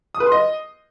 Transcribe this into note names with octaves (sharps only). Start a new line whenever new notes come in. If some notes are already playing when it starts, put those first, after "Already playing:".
D#6
B4
C6
D#5